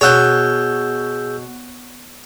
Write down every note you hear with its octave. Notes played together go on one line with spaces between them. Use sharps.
B2 G#4 C#5 F#5 E6 G6